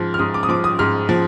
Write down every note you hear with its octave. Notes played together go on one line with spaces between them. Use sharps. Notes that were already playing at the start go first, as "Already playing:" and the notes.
Already playing: G#2 F3 F6
F6
G#2 D#6
D6
D#6
F3 D6
D#6
G#2 F6
F3